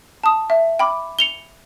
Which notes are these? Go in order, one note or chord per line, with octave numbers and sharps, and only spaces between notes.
A5 D#6
E5
G5 B5 D6
C#7 F7 G7